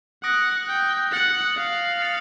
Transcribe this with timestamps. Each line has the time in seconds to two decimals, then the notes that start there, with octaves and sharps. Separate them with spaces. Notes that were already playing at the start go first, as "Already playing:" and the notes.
0.23 F#5 D#6 F#6 A#6 D7
0.68 G5
1.12 F#5 A6 C#7 F#7
1.57 F5
2.01 A6 C#7 F7